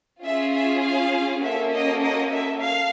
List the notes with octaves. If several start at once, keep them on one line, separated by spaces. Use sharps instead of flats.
C#4 F4 G#4 E5
E5
F5
A#3 C#4 F#4 A4 E5
D#5
D#5
E5
A4 F5